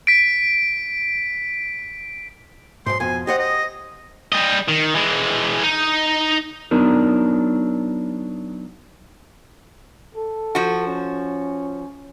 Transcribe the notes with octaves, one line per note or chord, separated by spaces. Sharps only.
B6 D7
B1 G#2 C6
F2 B2 G#5
G4 C5 D#5 F#5
D#5
G3 D#5
D#3
E3 G#3
D#4
F#3 B3 D4 D#4 A#4
A4
F3 F#4
C#4